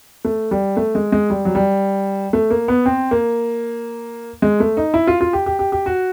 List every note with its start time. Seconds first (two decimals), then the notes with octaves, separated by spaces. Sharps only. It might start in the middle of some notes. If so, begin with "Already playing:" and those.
0.25 A3
0.51 G3
0.77 A3
0.95 G#3
1.12 G#3
1.30 G3
1.45 F#3
1.55 G3
2.33 A3
2.50 A#3
2.68 B3
2.86 C4
3.11 A#3
4.42 G#3
4.60 A3
4.77 D#4
4.94 E4
5.07 F4
5.21 F4
5.33 G4
5.46 G4
5.59 G4
5.72 G4
5.86 F#4